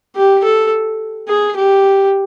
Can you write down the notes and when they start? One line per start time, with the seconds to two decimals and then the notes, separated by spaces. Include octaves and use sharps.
0.16 G4
0.44 A4
1.28 G#4
1.56 G4